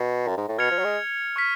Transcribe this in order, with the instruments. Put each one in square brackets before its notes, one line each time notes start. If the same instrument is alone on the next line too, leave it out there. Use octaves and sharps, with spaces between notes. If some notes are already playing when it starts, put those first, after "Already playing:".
Already playing: [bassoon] B2
F#2
G#2
A2
[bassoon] B2 [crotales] F6 G#6 C#7 F7
[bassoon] F3
F#3
G#3
[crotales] C#6 F6 B6